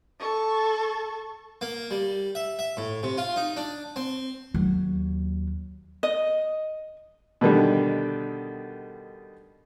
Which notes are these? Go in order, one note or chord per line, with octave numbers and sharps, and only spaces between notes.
A4 C#6
A#3
G3
E5
E5
A2
C3
F4
D#4
D4
C4
D#2 F#3
D#5
B2 D3 D#3 G3